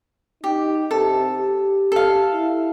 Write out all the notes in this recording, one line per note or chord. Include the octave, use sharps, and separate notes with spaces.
D#4 G4
C3 A4
G4
A4 F5
E4